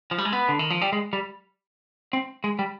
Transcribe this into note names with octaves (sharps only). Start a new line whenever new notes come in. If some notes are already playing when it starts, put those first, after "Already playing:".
F3
G3
G#3
B3
D3
D#3
F3
G3
G#3
G3
C4
G#3
G3